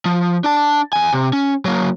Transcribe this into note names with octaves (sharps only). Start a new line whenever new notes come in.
F3
D4 A5
E2 G#5
C3
C#4
F#3 A#3